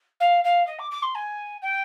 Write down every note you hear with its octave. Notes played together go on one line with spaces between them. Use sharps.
F5
F5
D#5
D6
D6
C6
G#5
G5